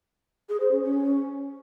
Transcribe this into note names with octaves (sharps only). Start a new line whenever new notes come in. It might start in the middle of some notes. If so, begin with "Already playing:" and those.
G#4
C5
C#4
C#4